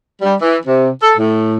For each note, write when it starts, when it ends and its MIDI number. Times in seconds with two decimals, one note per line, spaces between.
0.22 0.35 55
0.42 0.57 52
0.66 0.88 48
1.02 1.12 69
1.17 1.58 45